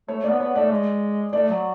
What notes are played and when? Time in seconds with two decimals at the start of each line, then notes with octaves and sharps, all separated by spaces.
0.08 A3 C#5
0.19 A3
0.24 B3 D5
0.39 B3 C#5
0.55 A3 D5
0.70 G#3
1.33 A3 D5
1.49 F#3